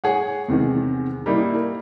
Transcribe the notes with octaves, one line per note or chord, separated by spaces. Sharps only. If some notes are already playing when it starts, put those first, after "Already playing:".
G#4 C#5 F#5
E2 C3 D#3 G#3
G3 A#3 D#4 E4
A#4